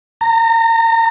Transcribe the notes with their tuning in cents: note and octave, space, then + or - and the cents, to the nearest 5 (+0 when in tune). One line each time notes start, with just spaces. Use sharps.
A#5 -25